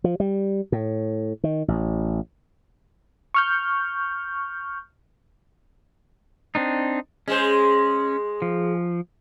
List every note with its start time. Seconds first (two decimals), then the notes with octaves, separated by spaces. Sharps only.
0.04 F3
0.20 G3
0.72 A2
1.44 D#3
1.68 A1
3.34 C#6 F6 G6
6.55 C4 D4 D#4
7.28 G#3 C#4 G#4 C5
8.42 F3